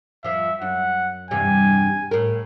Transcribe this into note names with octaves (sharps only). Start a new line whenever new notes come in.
F2 F3 E5
F#2 F#5
E2 G2 C3 G#5
A2 A#4